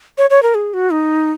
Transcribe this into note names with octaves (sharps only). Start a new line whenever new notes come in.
C#5
C#5
A#4
G#4
F#4
D#4